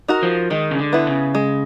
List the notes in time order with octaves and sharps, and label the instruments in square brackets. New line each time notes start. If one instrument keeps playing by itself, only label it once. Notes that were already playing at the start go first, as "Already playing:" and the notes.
[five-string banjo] D#4 F#4 A#4
[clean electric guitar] F3
[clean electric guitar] D#3 [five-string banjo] G#3
[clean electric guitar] C#3
D3
[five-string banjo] B3 E4
[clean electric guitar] C#3
[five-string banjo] G#3